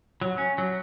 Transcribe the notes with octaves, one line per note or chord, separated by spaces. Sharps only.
F#3
C#4
F#3